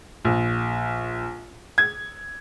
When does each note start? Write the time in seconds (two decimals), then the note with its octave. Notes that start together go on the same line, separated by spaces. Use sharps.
0.25 A#1
1.78 G#6